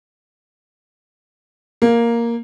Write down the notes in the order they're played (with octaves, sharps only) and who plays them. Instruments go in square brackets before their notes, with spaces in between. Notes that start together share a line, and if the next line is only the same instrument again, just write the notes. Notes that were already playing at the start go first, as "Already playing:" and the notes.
[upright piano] A#3